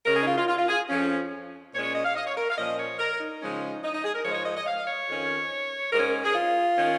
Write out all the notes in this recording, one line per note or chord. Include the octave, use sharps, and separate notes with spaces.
C#3 G#3 C#4 A#4
G#4
D#4
F4
F4
F4
F4
G#4
F2 F3 C#4
A#2 G#3 C#4 C#5
C#5
D#5
F5
D#5
C#5
A#4
F5
A#2 F3 A#3 C#4 D#5
C#5
A#4
D#4
C#3 F3 G#3 C#4
D#4
D#4
G#4
A#4
G#2 F3 G#3 C#5
D#5
C#5
D#5
D#5
F5
C#5
F2 D#3 C#4
G#2 G#3 C#4 A#4
A#4
G#4
F4
D#3 C#4